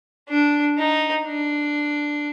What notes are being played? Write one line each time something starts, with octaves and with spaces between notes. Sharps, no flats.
D4
D#4
D4